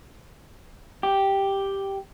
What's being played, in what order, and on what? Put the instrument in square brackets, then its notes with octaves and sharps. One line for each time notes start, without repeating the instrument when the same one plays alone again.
[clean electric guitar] G4